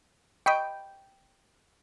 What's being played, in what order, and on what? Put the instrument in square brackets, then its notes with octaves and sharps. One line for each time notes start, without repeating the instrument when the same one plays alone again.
[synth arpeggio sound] D#5 B5 C#6 [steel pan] G5